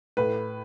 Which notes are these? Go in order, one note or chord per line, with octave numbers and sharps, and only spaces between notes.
A2 B4